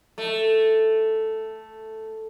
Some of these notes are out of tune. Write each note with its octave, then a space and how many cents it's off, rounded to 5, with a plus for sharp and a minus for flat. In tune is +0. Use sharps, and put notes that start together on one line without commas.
A3 +0